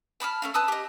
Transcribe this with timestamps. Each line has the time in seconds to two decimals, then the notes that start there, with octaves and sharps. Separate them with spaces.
0.20 A5 B5 D6 F6
0.42 A3 C#4 F5
0.54 B4 A5 D#6 E6
0.68 G4 D#5